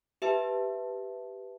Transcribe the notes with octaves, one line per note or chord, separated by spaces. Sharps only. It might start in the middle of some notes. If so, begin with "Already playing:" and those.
G4 B4 E5 A5